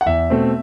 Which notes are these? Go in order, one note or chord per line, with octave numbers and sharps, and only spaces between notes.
F#5
E2 E5
B2 A3 C4